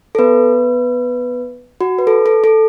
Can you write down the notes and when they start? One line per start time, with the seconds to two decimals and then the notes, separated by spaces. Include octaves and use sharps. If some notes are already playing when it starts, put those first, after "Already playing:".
0.15 A4
0.19 B3 B4
1.81 F#4
1.99 B4
2.07 A4
2.26 A4
2.44 A4